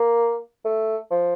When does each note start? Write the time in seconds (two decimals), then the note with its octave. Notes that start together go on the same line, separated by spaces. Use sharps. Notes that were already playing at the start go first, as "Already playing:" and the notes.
Already playing: A#3
0.65 A3
1.11 F3